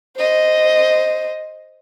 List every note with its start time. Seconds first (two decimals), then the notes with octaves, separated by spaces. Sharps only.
0.17 C5 D#5